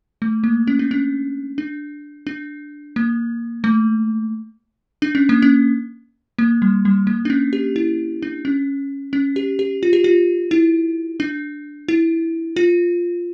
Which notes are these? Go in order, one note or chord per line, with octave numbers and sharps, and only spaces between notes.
A3
A#3
C#4
D4
C#4
D4
D4
A#3
A3
D4
C#4
A#3
C#4
A#3
G3
G3
A#3
D4
C#4
G4
E4
D4
C#4
C#4
G4
G4
F4
G4
F4
E4
D4
E4
F4